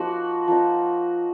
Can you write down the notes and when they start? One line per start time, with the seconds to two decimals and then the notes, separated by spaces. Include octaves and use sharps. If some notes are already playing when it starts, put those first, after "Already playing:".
Already playing: F3 A#3 D#4 F#4
0.48 F3 A#3 D#4